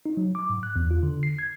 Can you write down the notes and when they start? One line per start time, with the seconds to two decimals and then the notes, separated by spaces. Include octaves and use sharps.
0.06 D#4
0.17 F#3
0.35 D6
0.50 G#2
0.63 F#6
0.76 E2
0.91 F4
1.03 D3
1.23 C7
1.39 G#6